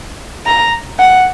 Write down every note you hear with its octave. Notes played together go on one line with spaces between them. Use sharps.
A#5
F#5